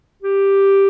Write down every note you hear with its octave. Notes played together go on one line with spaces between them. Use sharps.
G4